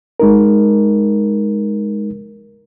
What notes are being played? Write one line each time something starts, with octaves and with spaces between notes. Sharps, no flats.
G#3 D#4 A#4